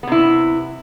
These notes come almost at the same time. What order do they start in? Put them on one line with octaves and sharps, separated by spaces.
B3 C3 E4